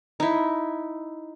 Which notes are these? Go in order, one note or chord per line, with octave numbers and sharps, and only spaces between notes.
D#4 E4